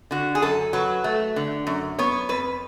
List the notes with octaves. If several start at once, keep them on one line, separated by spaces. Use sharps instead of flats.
D3 F#4
G#4
F#2 A4
F#3 B4
A3
D3
F#2
B3 C#5
F2 B4